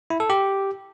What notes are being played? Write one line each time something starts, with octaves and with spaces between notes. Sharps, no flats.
E4
A4
G4